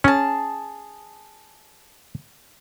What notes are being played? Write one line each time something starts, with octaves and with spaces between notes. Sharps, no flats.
C#4 G#4 A5